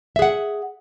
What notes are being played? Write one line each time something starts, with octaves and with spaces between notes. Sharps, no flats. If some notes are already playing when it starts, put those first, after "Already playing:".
G#4 E5 F#5